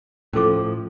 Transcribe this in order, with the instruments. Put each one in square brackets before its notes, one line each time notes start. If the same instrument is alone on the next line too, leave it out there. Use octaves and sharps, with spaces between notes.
[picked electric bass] A2 F3 [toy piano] C#4 A4 D6